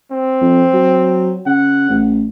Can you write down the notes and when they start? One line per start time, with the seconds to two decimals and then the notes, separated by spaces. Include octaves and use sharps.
0.11 C4
0.42 F2
0.74 F#3
1.46 C#3 F#5
1.90 A1